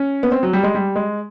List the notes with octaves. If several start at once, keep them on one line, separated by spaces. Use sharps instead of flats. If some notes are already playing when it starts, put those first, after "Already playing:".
Already playing: C#4
B3
C4
F#3
G3
G#3
G3
G#3